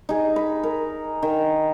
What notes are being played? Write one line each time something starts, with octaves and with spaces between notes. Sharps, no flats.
D#4 G#4 A#5
B5
A#4
D#3